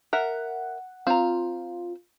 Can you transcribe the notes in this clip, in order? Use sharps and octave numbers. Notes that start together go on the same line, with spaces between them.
A#4 E5 F#5
C4 F4 A#5